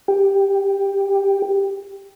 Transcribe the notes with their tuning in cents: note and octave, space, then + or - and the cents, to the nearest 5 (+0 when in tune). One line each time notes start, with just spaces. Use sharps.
G4 +10